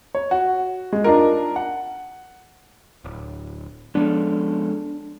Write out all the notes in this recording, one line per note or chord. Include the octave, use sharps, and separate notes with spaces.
C#5
F#4
G#3
D4 D#4 F4 A#4
F#5
D1
F3 G#3 B3 C#4 D4 A4